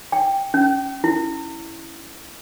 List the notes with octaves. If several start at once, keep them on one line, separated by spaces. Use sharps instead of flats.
G5
C#4
E4